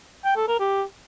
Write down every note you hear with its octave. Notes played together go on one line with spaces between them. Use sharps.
G5
A4
A#4
G4